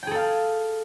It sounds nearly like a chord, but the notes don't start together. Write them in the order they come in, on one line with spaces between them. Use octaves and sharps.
G5 G#4 A4 F5